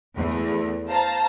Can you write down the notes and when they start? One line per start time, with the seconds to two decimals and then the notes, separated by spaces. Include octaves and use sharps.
0.16 E2 A3
0.89 C5 F5 A5 A#5